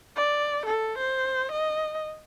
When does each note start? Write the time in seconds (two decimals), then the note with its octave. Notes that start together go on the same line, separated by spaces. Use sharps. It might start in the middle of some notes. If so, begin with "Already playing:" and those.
0.16 D5
0.66 A4
0.98 C5
1.52 D#5